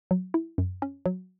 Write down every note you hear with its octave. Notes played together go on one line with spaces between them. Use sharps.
F#3
E4
F#2
C#4
F#3